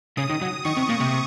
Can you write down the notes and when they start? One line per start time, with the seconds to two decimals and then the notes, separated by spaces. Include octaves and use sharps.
0.17 C#3 D#6
0.30 D#3
0.42 F#3
0.65 D#3 C#6
0.77 C3
0.89 A#2
1.00 C3